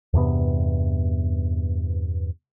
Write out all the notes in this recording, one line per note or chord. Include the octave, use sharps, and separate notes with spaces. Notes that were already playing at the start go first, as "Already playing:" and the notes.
E2 G2 C3 B3